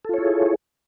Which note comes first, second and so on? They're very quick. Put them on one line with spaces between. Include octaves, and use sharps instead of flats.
A4 F4 C#5 E4 G#4